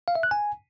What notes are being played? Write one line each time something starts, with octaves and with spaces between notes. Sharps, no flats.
F5
E5
F#6
G#5